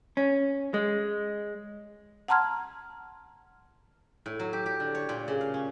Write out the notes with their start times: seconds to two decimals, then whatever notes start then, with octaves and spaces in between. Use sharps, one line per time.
0.17 C#4
0.74 G#3
2.28 F#5 A5 A#5 C6 F6 G#6
4.26 A2
4.39 F#3
4.53 G4
4.66 G4
4.80 D3
4.95 C#5
5.09 A#2
5.28 C#3
5.41 F5
5.54 C#4